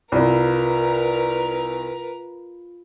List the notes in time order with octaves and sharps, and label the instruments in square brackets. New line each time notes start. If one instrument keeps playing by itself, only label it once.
[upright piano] C2 [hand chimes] F4 B5 [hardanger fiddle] A#4 B4